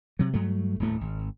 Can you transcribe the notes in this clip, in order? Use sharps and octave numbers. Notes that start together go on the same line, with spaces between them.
C3 F#3
G2 F#3 A3
D#1 D2 A2 A3
G#1